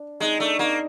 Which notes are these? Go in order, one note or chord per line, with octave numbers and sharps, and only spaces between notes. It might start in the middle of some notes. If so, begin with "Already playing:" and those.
Already playing: D4
G#3 D#4
A3 D4
A#3 D#4